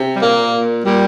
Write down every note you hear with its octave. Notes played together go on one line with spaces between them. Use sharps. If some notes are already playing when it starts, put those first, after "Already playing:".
Already playing: C3
G3
A#2 A#3
A#2
A#2 G3